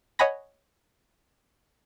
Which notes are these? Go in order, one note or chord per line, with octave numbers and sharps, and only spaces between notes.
C#5 D#5 F#5 G#5 B5 A#6